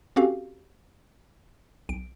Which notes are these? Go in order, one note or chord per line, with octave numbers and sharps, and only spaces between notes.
C4 C#4 F#4 G4 A4 F5
B1 D7